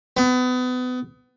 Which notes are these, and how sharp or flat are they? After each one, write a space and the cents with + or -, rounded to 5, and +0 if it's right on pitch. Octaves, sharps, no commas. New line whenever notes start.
B3 +30